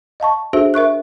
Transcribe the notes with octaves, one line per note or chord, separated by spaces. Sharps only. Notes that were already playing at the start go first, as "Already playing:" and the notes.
D#5 F5 A5 C#6
D4 F#4 G#4 A4 C5 E5
A#4 E5 C#6 F#6